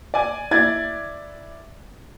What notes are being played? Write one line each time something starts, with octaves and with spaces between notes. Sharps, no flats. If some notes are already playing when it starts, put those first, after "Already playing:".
D5 G#5
E4 D5 G#6 A6